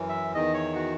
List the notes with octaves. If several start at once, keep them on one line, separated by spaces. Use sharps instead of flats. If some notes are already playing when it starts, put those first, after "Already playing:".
Already playing: F#2 E3
E5
E2 D#3 D#5
C#5
F#4